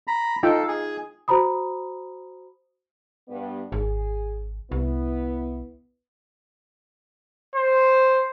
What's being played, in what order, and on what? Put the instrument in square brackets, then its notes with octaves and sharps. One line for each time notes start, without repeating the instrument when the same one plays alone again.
[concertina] A#5 B5
[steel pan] D#4 F4 G5 [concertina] A4
[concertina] G#4
[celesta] F#4 C5 A#5 B5 D#6
[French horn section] G2 B3 D5
[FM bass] G#1 [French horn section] G#4
[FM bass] C2 [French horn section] B3 E4
[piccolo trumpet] C5